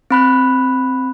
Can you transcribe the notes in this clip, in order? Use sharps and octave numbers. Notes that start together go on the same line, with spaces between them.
C4 B5 F#6